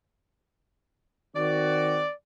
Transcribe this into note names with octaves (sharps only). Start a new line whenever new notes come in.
D#3 C4 F#4 D5